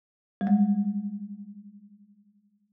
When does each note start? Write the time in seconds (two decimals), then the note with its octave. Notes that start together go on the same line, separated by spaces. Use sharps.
0.41 G3
0.47 G#3